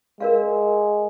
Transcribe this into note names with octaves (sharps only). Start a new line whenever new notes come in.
G#3 A#4 D5 F5